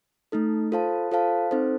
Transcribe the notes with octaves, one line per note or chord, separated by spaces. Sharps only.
A3 D#4 A4
F4 A4 C5 F5 A5
F4 A4 C5 F5 A5
C4 D#4 A4 C5